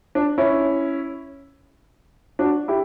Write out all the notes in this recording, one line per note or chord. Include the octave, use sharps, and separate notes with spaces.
D4
C#4 E4
D4 F#4
E4 G4